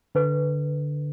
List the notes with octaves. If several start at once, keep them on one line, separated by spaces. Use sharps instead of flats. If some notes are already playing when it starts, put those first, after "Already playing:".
D3 B4